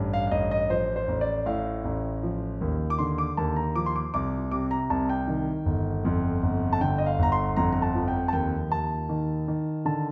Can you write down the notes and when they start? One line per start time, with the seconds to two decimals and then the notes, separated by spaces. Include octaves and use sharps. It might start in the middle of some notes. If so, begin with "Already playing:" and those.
Already playing: A1 G2
0.13 F5
0.27 F5
0.31 A1 D#5
0.51 D#5
0.70 F3 C5
0.96 C5
1.08 A1
1.21 D5
1.46 A2 F5
1.85 A1
2.23 F3
2.61 D#2
2.90 D6
2.98 D3 C6
3.18 D6
3.37 D#2 A5
3.56 A#5
3.75 F3 D6
3.86 C6
3.96 D6
4.14 C2 D6
4.52 C3 D6
4.71 A#5
4.90 C2 A5
5.09 G5
5.27 D#3
5.66 G1
6.05 F2
6.43 G1
6.73 A5
6.81 D3 G5
6.98 D#5
7.06 F5
7.19 G1 A#5
7.32 C6
7.56 F2 A#5
7.73 A#5
7.82 A5
7.95 F3
8.08 G5
8.28 A5
8.33 D#2 G5
8.71 D#2 A5
9.09 D#3
9.48 D#3
9.85 D3 A5